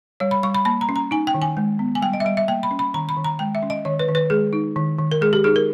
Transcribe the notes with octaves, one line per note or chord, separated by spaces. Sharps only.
G3 C#5
B5
G3 C#6
B5
A#3 B5
A#5
C#4
A#5
D#4 G#5
G5
D#3
G#5
G#3
B3
G#5
G3 G5
D#5
E5
G3 D#5
E5
A#3 G5
B5
C#4
B5
D#3 A#5
B5
D#3
A#5
G#3 G5
E5
C#4
D#5
D#3 C#5
B4
D#3
B4
G#3 G#4
D#4
D#3
D#3
A#4
G#3 G#4
G4
D#4 G#4
A#4